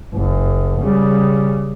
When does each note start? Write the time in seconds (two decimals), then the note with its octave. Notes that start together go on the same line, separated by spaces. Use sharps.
0.14 F#1
0.79 C#3 G3